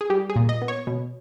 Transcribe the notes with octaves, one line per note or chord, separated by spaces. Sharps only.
G#4
G3 G4
G#4
A#2
D#5
B3
C#5
B2